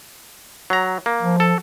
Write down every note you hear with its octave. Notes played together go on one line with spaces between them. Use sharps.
F#3 A#5
A#3
F3
A4